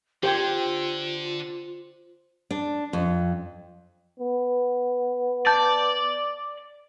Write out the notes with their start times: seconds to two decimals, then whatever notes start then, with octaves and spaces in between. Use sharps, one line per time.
0.23 D3 F4 G4 C5 G5 G#6
2.51 D4
2.93 F2
4.19 B3
5.47 D5 A5 G6 A6